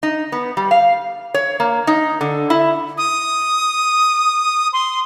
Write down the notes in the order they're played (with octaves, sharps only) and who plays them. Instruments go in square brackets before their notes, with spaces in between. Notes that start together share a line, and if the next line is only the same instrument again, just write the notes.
[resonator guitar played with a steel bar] D#4
B3
G3
F5
C#5
A#3
D#4
D3
E4
[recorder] D#6
C6